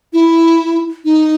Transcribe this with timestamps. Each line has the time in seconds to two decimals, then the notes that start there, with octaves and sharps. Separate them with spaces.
0.13 E4
1.05 D#4